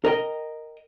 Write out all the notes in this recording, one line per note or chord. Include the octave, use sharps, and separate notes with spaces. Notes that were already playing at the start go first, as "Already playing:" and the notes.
A#4 D#5 G5